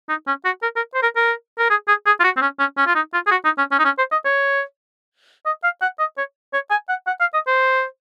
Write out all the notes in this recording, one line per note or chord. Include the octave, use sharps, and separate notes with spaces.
D#4
C#4
F#4
A#4
A#4
C5
A#4
A#4
A#4
G#4
G#4
G#4
F4
F#4
C4
C#4
C#4
C#4
F4
D#4
F4
G#4
F#4
D#4
C#4
C#4
D#4
C#4
C5
D#5
C#5
D#5
F5
F#5
D#5
C#5
C#5
G#5
F#5
F#5
F5
D#5
C5